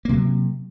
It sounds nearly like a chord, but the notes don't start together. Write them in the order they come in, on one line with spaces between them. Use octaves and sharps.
A#3 C3 F#3